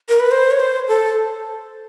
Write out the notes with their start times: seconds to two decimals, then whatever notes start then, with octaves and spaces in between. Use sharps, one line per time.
0.09 A#4
0.20 B4
0.31 C5
0.51 C#5
0.60 C5
0.88 A4